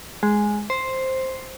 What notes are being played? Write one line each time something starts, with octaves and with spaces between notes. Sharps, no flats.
G#3
C5